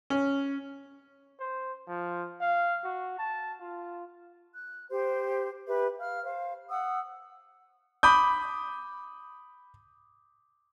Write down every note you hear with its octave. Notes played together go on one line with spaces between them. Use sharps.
C#4
C5
F3
F5
F#4
A5
F4
F#6
G4 C5
G4 B4 E5
F5 F6
C5 F5
F#5 D#6 E6
B5 D6 D#6 G6